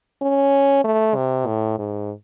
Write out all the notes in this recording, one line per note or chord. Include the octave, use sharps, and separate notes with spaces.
C#4
A3
C3
A2
G#2